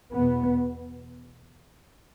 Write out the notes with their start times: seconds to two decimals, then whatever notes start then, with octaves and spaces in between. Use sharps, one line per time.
0.14 E2 B2 B3